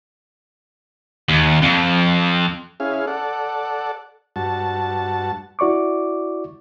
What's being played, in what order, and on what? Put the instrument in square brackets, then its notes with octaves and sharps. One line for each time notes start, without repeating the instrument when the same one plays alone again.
[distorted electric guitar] D#2
F2
[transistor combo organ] C#4 E4 G#4 F5
A4 D5 F#5
G2 F#4 A5
[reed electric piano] E4 F#4 D5 C#6 D6